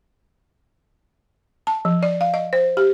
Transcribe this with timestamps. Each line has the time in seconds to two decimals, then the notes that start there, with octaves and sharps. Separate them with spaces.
1.67 A5
1.85 F3
2.03 D5
2.21 F5
2.34 D#5
2.53 C5
2.77 G4